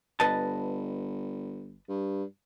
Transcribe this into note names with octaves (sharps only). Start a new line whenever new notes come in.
G1 B4 D#5 A5
G2